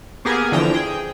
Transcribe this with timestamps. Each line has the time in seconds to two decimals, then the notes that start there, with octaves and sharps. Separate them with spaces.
0.25 A#3 B3 G4 G#4 A#4 G#5
0.52 D3 E3 F3 G5 A#5 E7
0.74 G#4 G5